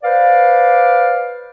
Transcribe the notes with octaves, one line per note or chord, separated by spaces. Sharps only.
B4 C5 D5 F5